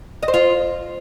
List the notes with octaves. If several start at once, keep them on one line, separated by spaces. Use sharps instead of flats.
D#5
C5
F4